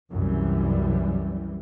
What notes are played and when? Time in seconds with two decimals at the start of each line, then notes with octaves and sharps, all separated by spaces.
0.10 C2 F#2 E3 G3